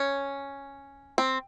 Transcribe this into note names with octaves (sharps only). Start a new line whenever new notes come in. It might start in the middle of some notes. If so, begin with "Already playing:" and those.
Already playing: C#4
C4